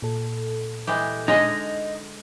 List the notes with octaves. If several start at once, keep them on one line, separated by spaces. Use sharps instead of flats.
A#2 A4
E3 G#3 G4
D3 G#3 D#4 D#5